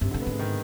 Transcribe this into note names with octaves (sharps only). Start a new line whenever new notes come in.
G2 C3
G#2 D3
B3
G#2 G#3
D#3